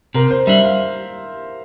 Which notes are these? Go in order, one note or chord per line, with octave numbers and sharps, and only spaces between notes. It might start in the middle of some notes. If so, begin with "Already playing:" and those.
C3 A#4
C5
G3 D4 E5
F5